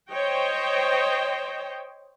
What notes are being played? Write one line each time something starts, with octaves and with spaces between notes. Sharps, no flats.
C5 C#5 D#5 G5